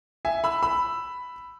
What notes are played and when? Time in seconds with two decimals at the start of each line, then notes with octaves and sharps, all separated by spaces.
0.25 E5 G#5
0.44 B5 E6
0.63 B5 E6